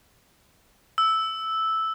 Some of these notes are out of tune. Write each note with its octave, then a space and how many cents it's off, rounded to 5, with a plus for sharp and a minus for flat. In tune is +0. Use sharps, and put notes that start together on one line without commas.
E6 -5